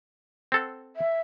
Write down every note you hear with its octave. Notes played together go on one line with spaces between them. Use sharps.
C4 A4 F#5
E5